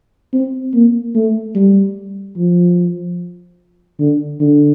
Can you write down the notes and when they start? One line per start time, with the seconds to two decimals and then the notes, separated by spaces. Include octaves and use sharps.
0.33 C4
0.74 A#3
1.15 A3
1.55 G3
2.37 F3
3.99 D3
4.40 D3